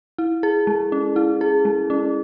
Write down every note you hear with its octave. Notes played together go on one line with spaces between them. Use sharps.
E4
G#4
G#3
C#4
E4
G#4
G#3
C#4